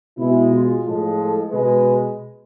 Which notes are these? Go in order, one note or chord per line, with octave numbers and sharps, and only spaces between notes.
B2 G#3 E4
F4
A2 F3 G#3
A4
B2 G#3 B4